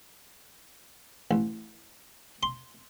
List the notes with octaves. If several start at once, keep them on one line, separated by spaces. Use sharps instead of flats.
A1
C6